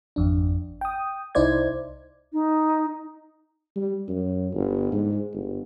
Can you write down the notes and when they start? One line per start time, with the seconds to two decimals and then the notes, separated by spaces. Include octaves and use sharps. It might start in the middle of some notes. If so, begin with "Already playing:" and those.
0.16 G#1 F2 D4
0.81 G5 D#6
1.35 C2 D#4 E4 C5 D5 G#6
2.33 D#4
3.76 G3
4.08 F#2
4.54 G1
4.92 G#2
5.33 G1